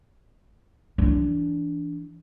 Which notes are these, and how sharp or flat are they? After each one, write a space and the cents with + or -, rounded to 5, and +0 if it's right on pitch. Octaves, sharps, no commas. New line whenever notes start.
E3 +0 D4 -15